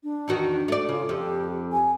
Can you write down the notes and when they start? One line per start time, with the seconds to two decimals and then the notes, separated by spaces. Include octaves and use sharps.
0.03 D4
0.28 E2 D#3 F#4
0.68 A3 D5
0.89 C#3 F4
1.09 F2 G4
1.72 G#5